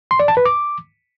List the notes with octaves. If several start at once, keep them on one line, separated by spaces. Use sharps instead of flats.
C6
D5
A5
B4
D6